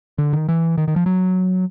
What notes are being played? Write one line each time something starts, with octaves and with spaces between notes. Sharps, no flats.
D3
D#3
E3
D#3
D#3
F3
F#3